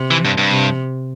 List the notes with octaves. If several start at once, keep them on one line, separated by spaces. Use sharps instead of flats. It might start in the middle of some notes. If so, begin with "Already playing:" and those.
Already playing: C3
E3
G2
G2
C3